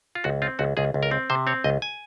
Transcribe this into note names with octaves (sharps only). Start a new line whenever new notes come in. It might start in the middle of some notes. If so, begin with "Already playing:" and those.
F4
C#2 F#4
C4 F4
C#2 F#4
C#2 G#4
C#2
A#4
C4
C3 C5
C4 C#5
C#2 D#5
G#5